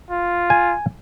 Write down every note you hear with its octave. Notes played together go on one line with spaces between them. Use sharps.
F4
G#5